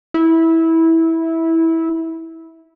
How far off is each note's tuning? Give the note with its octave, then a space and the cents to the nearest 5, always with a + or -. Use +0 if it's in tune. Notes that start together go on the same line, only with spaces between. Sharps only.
E4 -15